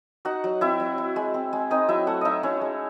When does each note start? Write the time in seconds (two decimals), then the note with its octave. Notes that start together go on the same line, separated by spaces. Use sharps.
0.25 D#4 F#4 F#5
0.44 F#3
0.61 C4 E4 E5
0.80 F#3
0.98 E4
1.16 G#3
1.34 C4
1.53 G#3
1.71 C4 D#4 D#5
1.88 F#3 E4 E5
2.07 A3 F#4 F#5
2.21 D#4 E4 D#5 E5
2.43 C#4 E4 C#5
2.61 G#3